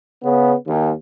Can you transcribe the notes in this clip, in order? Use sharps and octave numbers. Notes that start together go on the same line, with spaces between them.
C#3 B3
D#2